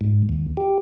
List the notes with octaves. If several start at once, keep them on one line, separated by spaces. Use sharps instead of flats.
G#2
D#2
G4